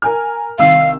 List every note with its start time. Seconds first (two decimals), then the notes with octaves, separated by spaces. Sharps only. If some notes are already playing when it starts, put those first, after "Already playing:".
0.02 A#4 G#5 F6
0.59 C2 D#3 F5 E6